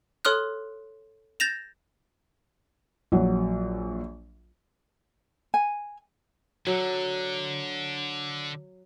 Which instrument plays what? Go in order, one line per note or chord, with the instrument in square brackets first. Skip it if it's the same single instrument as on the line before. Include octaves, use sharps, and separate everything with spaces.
[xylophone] A4 C#5 C6 D#6 F6 F#6
G6 A6 A#6 E7 F7
[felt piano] A#1 F#3
[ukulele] G#5
[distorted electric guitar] D3 [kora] F#3